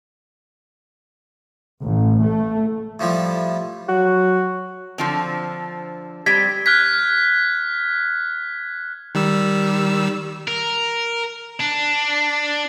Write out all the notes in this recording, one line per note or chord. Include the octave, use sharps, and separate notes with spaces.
A1
A3
A2 F3 G3
F#3 F#4
D3 F3 C4
G3 C4 G#6 B6
F6 F#6 G#6 B6
D#3 G3 E6
A#4
D4